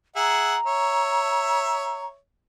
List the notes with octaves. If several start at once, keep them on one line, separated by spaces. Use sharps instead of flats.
G#4 E5 F#5 A#5
C#5 E5